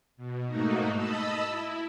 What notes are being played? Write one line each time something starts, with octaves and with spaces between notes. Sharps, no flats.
B2
G#2 A3 A#3 D#4 F#4
D#5 A5 B5 E6
E4